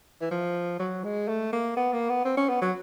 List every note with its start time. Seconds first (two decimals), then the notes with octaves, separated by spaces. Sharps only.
0.21 E3
0.31 F3
0.79 F#3
1.04 G#3
1.28 A3
1.53 A#3
1.77 B3
1.93 A#3
2.09 B3
2.25 C4
2.37 C#4
2.49 B3
2.62 F#3